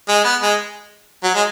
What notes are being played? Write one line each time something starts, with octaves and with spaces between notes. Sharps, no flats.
G#3
B3
G#3
F#3
G#3